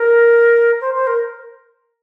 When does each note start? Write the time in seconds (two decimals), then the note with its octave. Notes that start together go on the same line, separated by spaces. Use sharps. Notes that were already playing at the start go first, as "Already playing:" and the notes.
Already playing: A#4
0.81 C5
0.95 C5
1.07 A#4